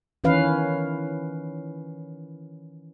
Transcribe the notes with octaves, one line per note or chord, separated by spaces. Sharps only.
D#3 E3 C#4 B4 F5